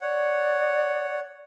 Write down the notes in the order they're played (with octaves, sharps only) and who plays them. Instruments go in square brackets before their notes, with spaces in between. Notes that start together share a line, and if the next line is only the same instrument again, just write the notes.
[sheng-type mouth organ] C#5 F#5 [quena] D5